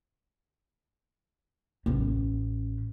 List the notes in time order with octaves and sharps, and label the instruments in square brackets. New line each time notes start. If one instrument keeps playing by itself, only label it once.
[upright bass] A1 C#4